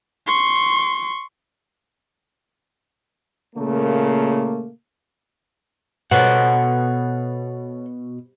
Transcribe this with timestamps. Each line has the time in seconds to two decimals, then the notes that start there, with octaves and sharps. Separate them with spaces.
0.27 C6 C#6
3.56 A#2 C#3 A3 A#3
6.11 B2 A4 C#5 F#5